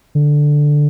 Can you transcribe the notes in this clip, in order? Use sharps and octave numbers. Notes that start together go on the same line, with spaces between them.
D3